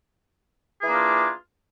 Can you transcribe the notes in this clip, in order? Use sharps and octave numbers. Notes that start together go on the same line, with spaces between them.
E3 A#3 D4 F4 G#4